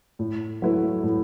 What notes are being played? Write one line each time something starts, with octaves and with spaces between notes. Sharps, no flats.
A2
F#3 A3 E4 B4
A2